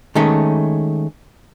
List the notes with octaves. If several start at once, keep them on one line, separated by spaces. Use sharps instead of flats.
D#3 G#3 A3 C#4